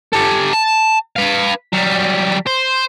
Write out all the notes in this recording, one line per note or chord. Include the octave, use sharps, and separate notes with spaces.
G4 A4
A5
B4 F5
F#3 G3
C5